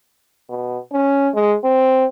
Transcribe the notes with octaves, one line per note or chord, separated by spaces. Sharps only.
B2
C#4
G#3
C4